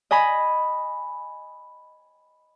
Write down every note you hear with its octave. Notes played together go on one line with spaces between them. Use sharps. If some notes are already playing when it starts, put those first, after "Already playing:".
D#5 G#5 B5